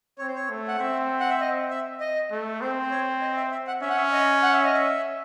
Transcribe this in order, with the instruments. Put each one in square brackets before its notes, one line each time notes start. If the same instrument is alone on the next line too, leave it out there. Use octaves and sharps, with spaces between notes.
[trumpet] C4 [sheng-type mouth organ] C#5
[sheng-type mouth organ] C5
C#5
[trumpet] A3
[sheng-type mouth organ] F#5
[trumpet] C4 [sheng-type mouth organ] E5
[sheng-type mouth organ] F#5
E5
D#5
E5
D#5
[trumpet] A3
[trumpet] C4 [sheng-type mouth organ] C5
[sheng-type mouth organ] C5
C#5
D#5
E5
E5
F#5
[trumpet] C#4 [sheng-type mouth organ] E5
[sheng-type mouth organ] F#5
E5
D#5
F#5
E5
D#5
E5